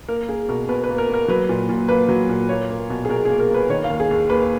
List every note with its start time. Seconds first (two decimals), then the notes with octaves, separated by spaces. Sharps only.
0.08 A#3 A#4
0.28 A#3 G#4
0.49 B2 A#4
0.69 B2 B4
0.84 B4
0.89 A#3
0.98 A#4
1.09 A#3 A#4
1.28 F#3 B4
1.49 A#2
1.69 A#2
1.89 A#3 B4
2.09 F#3
2.29 A#2
2.49 A#3 C#5
2.70 A#3
2.90 B2
3.05 G#4
3.09 B2 A#4
3.25 G#4
3.29 A#3
3.40 A#4
3.50 A#3 B4
3.69 D#3 C#5
3.84 F5
3.90 D#2
4.00 G#4
4.11 D#2
4.30 A#3 B4